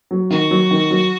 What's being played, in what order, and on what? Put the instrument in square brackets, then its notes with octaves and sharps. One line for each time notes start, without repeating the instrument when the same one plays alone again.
[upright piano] F#3
[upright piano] D#3 [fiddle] F#4
[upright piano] F#3
D#3
F#3